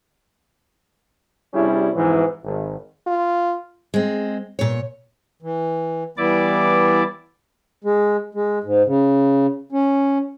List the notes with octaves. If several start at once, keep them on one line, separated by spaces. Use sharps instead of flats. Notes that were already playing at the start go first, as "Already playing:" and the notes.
C3 G3 C#4 D4 E4 G#4
F2 G#2 B2 E3
G#1
F4
G#3 C4
A#2 C#5
E3
E3 G3 B3 E4 D5 D6
G#3
G#3
G#2
C#3
C#4